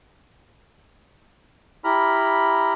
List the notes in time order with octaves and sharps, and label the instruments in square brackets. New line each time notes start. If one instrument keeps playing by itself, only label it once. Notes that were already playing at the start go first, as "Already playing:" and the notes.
[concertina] E4 G4 A#5 B5 F6